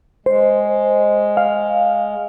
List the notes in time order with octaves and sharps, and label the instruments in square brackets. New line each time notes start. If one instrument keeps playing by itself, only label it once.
[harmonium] G#3 [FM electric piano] C5
[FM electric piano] F5